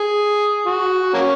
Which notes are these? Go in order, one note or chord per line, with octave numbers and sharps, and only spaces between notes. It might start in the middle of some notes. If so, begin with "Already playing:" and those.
Already playing: G#4
F#4
F#3 A#3 C#4